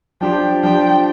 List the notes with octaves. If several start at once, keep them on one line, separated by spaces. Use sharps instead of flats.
F3 D4 G4 C5 G5
F3 D4 G4 C5 G5